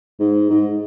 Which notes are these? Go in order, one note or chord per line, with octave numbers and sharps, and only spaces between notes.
G#2
G#2